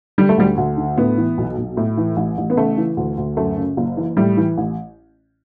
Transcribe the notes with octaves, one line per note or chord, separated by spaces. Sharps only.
D3 G3
A3
D2 G3
D2
D3
A2 B3
E3
B1
B1
A2
E3
A1
A1
B3
C#3 A3
E3
D2
D2
F#2 A3
C#3
F#1
E3
A2 G3
E3
A1